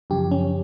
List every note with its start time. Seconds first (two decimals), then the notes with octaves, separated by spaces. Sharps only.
0.10 F#2 C#3 F3 G4
0.31 C#4